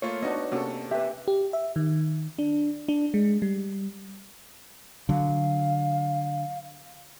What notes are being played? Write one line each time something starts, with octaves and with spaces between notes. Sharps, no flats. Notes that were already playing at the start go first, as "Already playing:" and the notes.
A3 A#3 F4 C#5
B3 D4 D#4 F#4 D#5
C3 A#3 C#4 F#4 A4
G4 B4 E5
G4
E5
D#3
D4
D4
G#3
G3
D3 F#3 F5